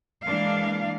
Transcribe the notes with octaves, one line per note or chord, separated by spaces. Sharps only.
E3 G#3 A#3 D4 F5